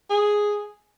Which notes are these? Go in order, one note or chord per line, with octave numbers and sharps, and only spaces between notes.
G#4